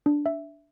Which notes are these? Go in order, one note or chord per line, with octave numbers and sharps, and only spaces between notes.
D4
E5